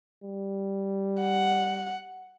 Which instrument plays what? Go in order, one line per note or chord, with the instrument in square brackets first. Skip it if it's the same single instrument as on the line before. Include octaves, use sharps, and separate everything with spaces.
[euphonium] G3
[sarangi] F#5